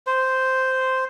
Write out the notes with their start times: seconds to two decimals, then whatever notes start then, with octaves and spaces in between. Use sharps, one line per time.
0.07 C5